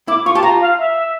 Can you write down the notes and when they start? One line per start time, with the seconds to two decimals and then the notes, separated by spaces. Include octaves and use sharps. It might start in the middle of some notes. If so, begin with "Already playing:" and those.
0.08 E4 D6
0.25 F4 C#6
0.35 G4 A5
0.43 F4 A#5
0.61 F5
0.79 E5